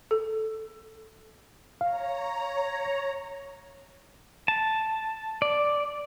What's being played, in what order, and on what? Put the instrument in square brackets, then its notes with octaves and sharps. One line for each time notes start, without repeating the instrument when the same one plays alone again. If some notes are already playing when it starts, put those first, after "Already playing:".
[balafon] A4
[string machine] C#5 A#5 [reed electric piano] F5
[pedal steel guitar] A5
D5